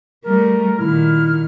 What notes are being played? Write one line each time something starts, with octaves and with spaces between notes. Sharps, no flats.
G3 A3 A#4
A#2 D#3 E4 F6